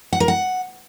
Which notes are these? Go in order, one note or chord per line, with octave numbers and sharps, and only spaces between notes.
F#5
A#4
F#5